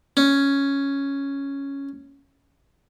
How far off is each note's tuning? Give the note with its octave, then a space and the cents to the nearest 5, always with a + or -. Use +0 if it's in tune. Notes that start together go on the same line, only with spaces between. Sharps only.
C#4 +0